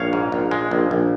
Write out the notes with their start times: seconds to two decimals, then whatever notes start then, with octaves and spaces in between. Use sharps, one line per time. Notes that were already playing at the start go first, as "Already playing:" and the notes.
Already playing: A#1 C#5 F5
0.13 G#2
0.32 A#1
0.51 G#3
0.71 A#1
0.91 A#1